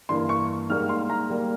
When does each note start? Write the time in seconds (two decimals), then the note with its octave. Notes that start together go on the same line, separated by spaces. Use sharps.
0.09 G2 E3 A#3 C6
0.29 C#6
0.70 G#2 G3 A#3 F6
0.89 C6
1.10 A#5
1.30 G3 A#3